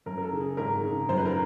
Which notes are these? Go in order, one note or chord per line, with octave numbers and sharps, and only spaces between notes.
F#2 A#4
A#4
A4
C#3
G#4
G#1 A#4
C#3
F#2 C5
B4
A#4